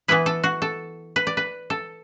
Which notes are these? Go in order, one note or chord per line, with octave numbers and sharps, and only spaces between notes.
E3 B3 E4 B4
A4
F#4
A4
B4
D5
B4
A4